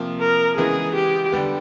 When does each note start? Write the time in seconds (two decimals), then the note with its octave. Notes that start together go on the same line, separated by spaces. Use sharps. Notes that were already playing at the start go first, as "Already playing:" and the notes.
Already playing: C3 F3 A#3
0.20 A#4
0.57 C#3 E3 G#3 B3 G#4
0.95 G4
1.32 D3 G3 B3